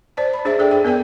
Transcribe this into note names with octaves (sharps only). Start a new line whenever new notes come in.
C5 D5 A5
B5
D4 G#4 C5 D5 E5
G#4 A4 D5 G5
G#4 G5
B3 A#4 D5 G5